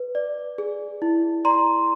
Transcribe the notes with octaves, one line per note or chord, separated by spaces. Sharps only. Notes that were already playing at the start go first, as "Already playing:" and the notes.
Already playing: B4
D5
G#4
E4
D5 A#5 C6